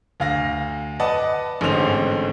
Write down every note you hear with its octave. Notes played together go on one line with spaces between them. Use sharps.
D2 F5 A#6
B4 D5 D#5 F#5 A5
A1 G#2 D3 C4 C5 F7